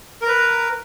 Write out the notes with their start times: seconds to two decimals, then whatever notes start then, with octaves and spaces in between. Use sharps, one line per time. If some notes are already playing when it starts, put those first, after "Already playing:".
0.22 A#4
0.25 A#5
0.28 B4